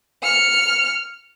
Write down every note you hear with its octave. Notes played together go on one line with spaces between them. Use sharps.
F6 C#7